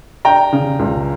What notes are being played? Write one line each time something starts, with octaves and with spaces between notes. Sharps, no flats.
D4 G5 A#5
C#3
C#2